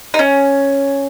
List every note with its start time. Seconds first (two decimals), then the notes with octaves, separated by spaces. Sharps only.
0.14 D#4
0.19 C#4